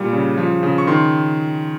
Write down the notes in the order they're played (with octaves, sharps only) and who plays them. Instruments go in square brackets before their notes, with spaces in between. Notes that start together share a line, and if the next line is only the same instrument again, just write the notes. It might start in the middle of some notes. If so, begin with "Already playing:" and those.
Already playing: [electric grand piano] A#2 G3
C#3
F3
C#3
C#6
D#3 C6